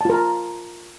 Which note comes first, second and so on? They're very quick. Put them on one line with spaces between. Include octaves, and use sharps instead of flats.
A5 F4 A#4 A#5